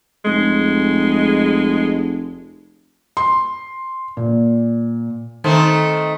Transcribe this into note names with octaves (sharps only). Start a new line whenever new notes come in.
F1 G#3
C6
A#2
D#3 A3 C4